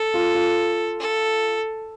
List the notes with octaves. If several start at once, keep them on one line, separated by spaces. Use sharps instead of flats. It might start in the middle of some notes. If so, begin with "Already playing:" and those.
Already playing: A4
F4
F4
A4